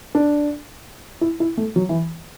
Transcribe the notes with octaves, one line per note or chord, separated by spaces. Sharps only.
D4
E4
E4
A3
F#3
E3